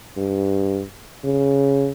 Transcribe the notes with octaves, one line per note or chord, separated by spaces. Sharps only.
G2
C#3